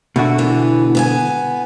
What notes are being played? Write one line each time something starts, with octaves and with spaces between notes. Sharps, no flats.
B2 D3 A3 F#4
E3 B3
B3 G#4 G#5